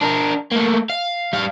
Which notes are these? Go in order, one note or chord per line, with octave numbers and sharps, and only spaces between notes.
D4 A#4
A3 A#3
F5
G3 F5